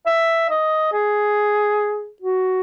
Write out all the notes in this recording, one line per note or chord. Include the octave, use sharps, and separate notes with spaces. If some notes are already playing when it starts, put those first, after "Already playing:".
E5
D#5
G#4
F#4